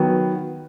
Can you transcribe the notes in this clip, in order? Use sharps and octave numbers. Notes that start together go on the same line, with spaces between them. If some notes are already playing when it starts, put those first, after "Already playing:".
Already playing: D#3 F#3 B3